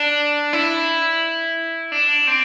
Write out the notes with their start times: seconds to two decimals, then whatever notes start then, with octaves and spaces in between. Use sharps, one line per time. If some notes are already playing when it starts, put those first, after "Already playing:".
Already playing: D4
0.53 E4
1.92 D4
2.27 C4